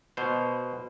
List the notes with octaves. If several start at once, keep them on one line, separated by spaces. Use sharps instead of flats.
B2 C5